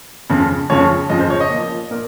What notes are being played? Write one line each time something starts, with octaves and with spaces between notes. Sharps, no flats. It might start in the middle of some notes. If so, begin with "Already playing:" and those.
F2 C#3 F3
F2 C#3 F3 C#5
F2 C#3 F3 D#5
C5
C#5
D#5
A#2 F3
A#2 A#4